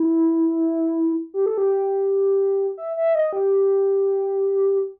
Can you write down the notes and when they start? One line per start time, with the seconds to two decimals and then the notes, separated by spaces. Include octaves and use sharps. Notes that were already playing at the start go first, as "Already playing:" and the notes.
Already playing: E4
1.34 G4
1.46 A4
1.58 G4
2.78 E5
2.97 E5
3.15 D#5
3.33 G4